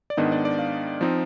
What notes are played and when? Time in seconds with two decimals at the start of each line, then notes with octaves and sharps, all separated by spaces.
0.10 D5
0.17 G#2 D#3 B3 D4 D#5
0.32 D5
0.45 D5
0.59 F5
1.01 F3 C4 D#4